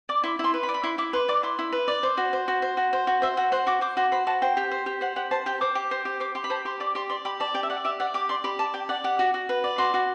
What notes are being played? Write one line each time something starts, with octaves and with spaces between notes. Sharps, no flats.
D5 D6
E4 C6
E4 C6
B4
B5
D5
B5
E4 C6
E4 D6
B4 C6
D5 D6
E4 C6
E4
B4
D5
C5
F#4
C5
F#4
C5
F#4
C5
F#4
C5 E5
F#4 F#5
C5 F#5
F#4 D6
C5 D6
F#4 C6
C5 B5
F#4 A5
C5 G5
G4
C5
G4
C5 F#5
G4 F#5
C5 A5
G4 G5
C5 D6
G4
C5
G4
C5 D6
G4 C6
B5
C5 A5
G4 C6
D5 D6
G4 C6
D5 C6
G4 B5
D5 A5
G4 G5
E5
D5 F#5
G4 E5
D5 F#5
G4 D6
D5 C6
G4 B5
D5 A5
G4 G5
D5 F#5
G4 F#5
F#4
F#4
B4
D5
F#4 C6
F#4